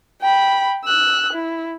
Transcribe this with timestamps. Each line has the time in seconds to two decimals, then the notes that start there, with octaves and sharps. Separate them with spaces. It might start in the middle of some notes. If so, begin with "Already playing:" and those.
0.21 G5 B5
0.85 E6 F#6
1.33 E4